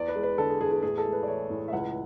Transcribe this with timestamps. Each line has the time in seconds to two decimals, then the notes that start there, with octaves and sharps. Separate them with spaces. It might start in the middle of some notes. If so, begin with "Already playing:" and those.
Already playing: E2 D5
0.08 B4
0.16 G#3
0.23 B4
0.38 D3 A4
0.50 G#4
0.61 E2 G#4
0.72 G#4
0.83 A2 G#4
0.98 A4
1.05 G#3
1.13 B4
1.23 D5
1.28 E3 C#5
1.50 A2
1.68 E5
1.73 C#2 F#5